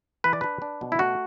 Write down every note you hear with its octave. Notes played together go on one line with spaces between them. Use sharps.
E3 B4
D5
D4 B4
D4
B2
E4
A3 F#4